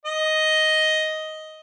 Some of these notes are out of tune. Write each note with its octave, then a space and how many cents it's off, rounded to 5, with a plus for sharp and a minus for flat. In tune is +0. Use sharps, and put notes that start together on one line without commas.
D#5 +5